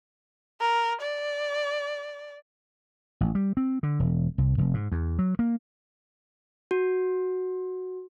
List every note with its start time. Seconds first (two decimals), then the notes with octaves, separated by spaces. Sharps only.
0.61 A#4
1.02 D5
3.21 A1
3.35 G3
3.57 C4
3.83 D3
4.00 E1
4.38 C2
4.58 F1
4.74 G#2
4.92 E2
5.19 F#3
5.39 A#3
6.71 F#4